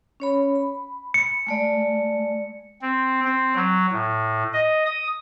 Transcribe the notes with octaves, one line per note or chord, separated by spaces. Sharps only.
C#4 C#5 B5
B5
C#7
G#3 A3 D5
C4
C4
F#3
A2
D#5
D#6